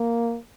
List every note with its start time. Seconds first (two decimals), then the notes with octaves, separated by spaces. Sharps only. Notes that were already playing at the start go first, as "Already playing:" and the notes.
Already playing: A#3